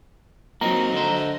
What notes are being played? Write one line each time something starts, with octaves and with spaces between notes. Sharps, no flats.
F#3 A#3 C4 D#4 D#5 A#5
D3 C5